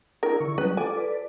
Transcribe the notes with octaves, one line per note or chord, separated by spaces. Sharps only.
D4 E4 G#4 A#4
D3 E4 C#6
F#3 G3 C#4 B4
F4 A4 G#5 D6
A4 B4 D5